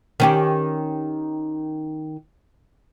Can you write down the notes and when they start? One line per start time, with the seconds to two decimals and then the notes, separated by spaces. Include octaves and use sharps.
0.20 D#3 C#4 G4